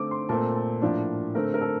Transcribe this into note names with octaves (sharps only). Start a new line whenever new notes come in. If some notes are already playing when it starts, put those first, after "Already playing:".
Already playing: D3 A3 C4 D6
C6
A#2 A3 C4 A5
A5
A2 F3 A#3 D4
D3 A3 C4 A#4
A#4
A4